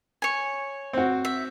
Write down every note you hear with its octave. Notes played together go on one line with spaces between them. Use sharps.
C#5 G#5
C4 F#4
E5